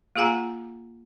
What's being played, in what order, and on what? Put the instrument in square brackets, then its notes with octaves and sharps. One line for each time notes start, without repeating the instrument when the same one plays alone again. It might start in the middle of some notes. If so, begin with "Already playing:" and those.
[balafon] A#3 F4 G#4 F#5 G#5 A#5